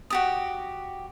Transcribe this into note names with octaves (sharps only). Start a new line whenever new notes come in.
F#4 G4 D#6